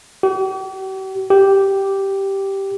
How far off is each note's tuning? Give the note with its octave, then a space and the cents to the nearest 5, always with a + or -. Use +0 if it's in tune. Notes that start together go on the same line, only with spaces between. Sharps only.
G4 -45
G4 -5